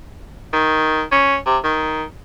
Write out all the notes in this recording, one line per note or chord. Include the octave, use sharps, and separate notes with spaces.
D#3
C#4
C3
D#3